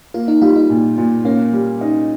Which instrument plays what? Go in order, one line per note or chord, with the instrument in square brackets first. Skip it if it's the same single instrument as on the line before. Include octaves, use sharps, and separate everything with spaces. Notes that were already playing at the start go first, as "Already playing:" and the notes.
[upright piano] A#3 [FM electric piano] F4
[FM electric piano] D#4
[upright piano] G3 [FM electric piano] F4
[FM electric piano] D#4
[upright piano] A#2
A#2
[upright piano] A#3 [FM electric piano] C#4
[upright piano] G3
D#4